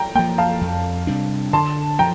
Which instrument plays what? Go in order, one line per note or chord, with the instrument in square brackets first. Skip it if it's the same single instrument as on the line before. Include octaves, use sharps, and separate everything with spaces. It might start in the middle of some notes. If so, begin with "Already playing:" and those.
Already playing: [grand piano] G5 A#5
[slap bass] A#3 [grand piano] G5
[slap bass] F3
[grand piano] F5 A5
[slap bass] F2
C3 G3 D4
[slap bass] D3 [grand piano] A5 C6
[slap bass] F3 [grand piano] G5 A#5